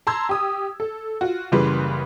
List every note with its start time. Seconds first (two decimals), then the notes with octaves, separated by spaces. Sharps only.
0.07 A5 A#5 C6 E6 G#6
0.29 G4 D#6
0.80 A4
1.21 F4 F#4
1.52 F#1 C#3 E3 G3 B4 C6